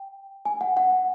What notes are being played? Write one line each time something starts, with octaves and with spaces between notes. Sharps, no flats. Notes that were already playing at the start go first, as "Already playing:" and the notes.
Already playing: G5
G#5
F#5
F#5